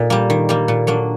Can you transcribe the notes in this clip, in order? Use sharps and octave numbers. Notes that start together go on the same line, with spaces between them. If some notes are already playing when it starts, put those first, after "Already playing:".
Already playing: A#2 D#4
G3 A#3
D#3
G3 A#3
A#2
F#3 A#3 D4